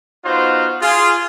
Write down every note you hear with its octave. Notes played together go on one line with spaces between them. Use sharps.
B3 D#4 F4 F#4 C5
F4 G#4